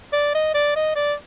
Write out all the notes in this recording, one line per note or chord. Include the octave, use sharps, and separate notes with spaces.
D5
D#5
D5
D#5
D5